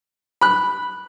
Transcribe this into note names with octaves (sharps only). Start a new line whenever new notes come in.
B5 F#6